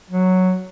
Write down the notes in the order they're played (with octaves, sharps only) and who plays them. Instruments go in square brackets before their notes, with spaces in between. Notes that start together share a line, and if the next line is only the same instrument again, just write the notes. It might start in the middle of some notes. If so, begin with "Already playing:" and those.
[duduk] F#3